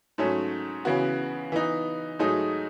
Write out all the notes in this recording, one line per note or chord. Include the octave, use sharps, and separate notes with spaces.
G#2 F#3 A3 C#4
C#3 E3 B3 F#4
E3 B3 D#4
G#2 F#3 A3 D#4 G#4